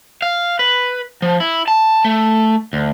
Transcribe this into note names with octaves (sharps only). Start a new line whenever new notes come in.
F5
B4
F3
E4
A5
A3
D2